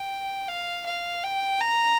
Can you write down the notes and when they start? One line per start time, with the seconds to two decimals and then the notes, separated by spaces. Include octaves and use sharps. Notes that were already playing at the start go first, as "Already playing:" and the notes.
Already playing: G5
0.48 F5
0.86 F5
1.24 G5
1.61 A#5